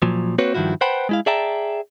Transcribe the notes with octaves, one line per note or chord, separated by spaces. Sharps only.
A#2 F3 F#3
A#3 C4 F#4 B4 C#5
G2 D#3 F3 E4 F#4
B4 C5 F#5 G5 A5 B5
G#3 E4 F5
G#4 D5 E5 G5 A5 A#5